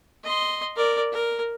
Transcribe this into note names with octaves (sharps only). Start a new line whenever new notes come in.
D#5 C6
A#4 D5
A#4